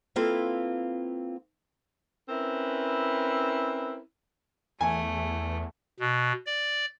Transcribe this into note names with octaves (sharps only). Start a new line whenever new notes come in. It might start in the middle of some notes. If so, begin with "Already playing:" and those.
A#3 C4 E4 F4 A4 B4
C4 C#4 E4 A#4 B4
E2 A3 G#5
B2
D5